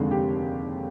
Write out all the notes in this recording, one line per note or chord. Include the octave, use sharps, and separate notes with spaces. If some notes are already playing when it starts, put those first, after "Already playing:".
Already playing: F1 D#2 D3 G#3
G4